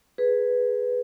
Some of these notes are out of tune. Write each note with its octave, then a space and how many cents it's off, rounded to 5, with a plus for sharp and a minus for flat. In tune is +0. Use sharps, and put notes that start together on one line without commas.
G#4 +0 B4 +0